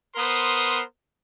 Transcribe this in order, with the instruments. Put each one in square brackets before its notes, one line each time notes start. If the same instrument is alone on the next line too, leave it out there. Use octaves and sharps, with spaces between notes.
[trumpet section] B3 A#4 C5 C6 D#6